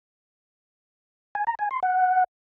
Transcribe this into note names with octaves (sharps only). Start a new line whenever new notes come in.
G#5
A#5
G#5
C6
F#5